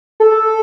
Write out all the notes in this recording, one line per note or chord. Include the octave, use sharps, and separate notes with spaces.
A4